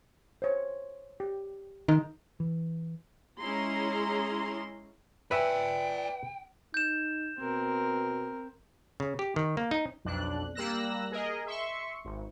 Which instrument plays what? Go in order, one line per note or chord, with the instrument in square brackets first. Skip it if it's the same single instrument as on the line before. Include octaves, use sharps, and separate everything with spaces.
[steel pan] C5 C#5
G4
[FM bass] D#3 [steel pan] D#4
[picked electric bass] E3
[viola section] G#3 C#4 E4 G#4 A#5 C6
[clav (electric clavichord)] B4 E5 [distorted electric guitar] D5 G#5 [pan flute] G5
[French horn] D#4 [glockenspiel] G6 E7
[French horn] B2 [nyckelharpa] C4 A#4
[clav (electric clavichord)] C#3
G4
D#3
A#3
D#4
[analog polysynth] B1 F2 D4 F#6
G3 A#3 E6 F#6 A#6
G#4 A#4 D#5
E5 C6 C#6
G#1